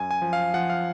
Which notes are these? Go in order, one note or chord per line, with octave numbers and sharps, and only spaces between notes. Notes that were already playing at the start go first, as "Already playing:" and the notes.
Already playing: F#2 G#5
G#5
F3
F5
F3 F#5
F5